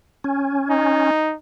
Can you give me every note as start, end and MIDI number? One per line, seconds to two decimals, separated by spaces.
0.24 1.11 61
0.70 1.34 63